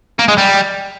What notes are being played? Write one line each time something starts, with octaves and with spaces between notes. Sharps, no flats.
A#3
G#3
G3